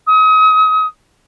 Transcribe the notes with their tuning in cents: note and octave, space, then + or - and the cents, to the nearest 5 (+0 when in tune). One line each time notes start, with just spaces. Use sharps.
D#6 +35